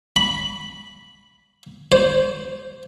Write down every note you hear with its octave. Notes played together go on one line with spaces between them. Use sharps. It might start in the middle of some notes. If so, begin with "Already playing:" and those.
B5
C5